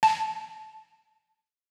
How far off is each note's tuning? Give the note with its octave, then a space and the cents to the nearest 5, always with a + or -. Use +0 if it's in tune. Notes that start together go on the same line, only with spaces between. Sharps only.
A5 -15